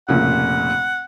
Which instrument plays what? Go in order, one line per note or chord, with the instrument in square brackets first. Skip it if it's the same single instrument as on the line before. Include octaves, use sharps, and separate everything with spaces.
[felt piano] F1 A#2 C#3 [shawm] F#5